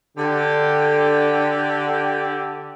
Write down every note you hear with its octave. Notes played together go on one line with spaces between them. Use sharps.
D3 G4